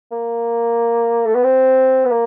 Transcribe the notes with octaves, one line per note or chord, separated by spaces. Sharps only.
A#3
A3
B3
C4
B3
A#3